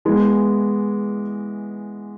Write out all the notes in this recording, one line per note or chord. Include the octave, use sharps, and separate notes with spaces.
E3 G#3 B3